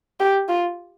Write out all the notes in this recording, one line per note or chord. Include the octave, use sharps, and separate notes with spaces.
G4
F4